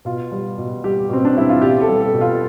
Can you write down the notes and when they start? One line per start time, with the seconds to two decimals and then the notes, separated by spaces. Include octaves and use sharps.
0.05 B2 F4
0.32 G3
0.58 B2
0.84 G3 G4
1.09 B2 C4
1.25 D4
1.35 G3 E4
1.49 F4
1.62 B2 G4
1.81 A4
1.88 G3
2.01 A4
2.14 B2
2.21 F4